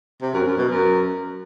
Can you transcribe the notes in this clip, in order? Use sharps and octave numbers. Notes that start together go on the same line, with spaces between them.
C3
F#2
F#2
B2
F#2